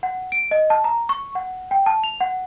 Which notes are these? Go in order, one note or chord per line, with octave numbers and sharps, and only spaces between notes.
F#5
D7
D#5
A5
A#5
C#6
F#5
G5
A5
F7
F#5